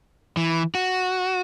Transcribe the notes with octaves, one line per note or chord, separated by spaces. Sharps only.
E3
F#4